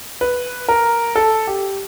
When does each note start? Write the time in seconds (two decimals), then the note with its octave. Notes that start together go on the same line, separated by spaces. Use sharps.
0.21 B4
0.69 A#4
1.16 A4
1.47 G4